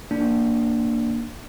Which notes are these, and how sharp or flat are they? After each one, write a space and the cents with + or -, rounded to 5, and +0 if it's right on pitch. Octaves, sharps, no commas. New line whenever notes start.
A#3 +0 D4 +0